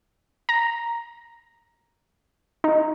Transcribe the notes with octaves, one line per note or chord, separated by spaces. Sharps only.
A#5
D#4